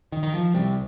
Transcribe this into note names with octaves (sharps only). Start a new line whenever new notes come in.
D#3
D#3
F3
C2 C3 G3